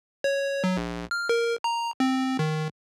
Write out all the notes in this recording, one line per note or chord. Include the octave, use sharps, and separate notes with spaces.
C#5
F#3
A#1
F6
A#4
A#5
C4
D#3